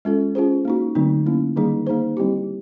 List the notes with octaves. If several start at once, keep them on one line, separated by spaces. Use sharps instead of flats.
G#3 C#4 F4 A4
C#4 F4 G#4 C5
A#3 D#4 F#4
D3 F#3 A3 C4 D#4
A#3 C#4 E4
D#3 G3 A#3 D#4 G#4
A#3 D#4 G#4 C5
G3 C4 E4 G4